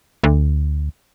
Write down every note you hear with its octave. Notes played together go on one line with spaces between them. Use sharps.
D2